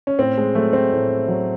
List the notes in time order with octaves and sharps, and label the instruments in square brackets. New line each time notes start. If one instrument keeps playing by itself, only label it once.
[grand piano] C#4
A2 C4
G#3
F#3 A3
C4
A2
F#3